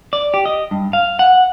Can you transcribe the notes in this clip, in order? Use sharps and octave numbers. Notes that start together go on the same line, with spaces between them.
D5
G4
D#5
G2
F5
F#5